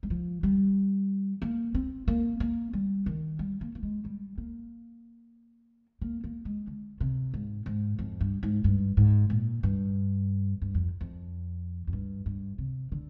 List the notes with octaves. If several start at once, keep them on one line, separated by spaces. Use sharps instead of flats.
G3
F3
G3
A#3
C4
A#3
A#3
G3
D#3
G3
A#3
A#3
G#3
G3
A#3
A#3
A#3
G#3
D3
C3
G#2
G#2
F2
G2
G#2
G2
G#2
A#2
G2
G2
F2
F2
F2
G2
G2
C3
D3